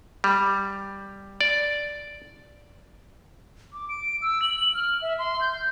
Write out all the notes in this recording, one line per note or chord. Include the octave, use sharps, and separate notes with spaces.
G3
D5
D6
D7
E6
F#7
F6
E5
C6
G6